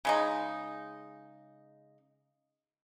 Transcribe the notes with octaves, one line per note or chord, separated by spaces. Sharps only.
C#3 G#3 D#4